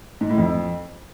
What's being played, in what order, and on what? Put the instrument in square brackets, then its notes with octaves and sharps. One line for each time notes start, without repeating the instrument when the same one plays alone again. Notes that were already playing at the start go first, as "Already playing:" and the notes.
[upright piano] G#2
A2
F2